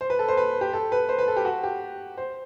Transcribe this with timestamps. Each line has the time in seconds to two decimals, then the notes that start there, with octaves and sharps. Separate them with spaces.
0.01 C5
0.10 B4
0.19 A4
0.28 C5
0.37 B4
0.61 G4
0.73 A4
0.92 B4
1.09 C5
1.18 B4
1.28 A4
1.36 G4
1.45 F#4
1.64 G4
2.17 C5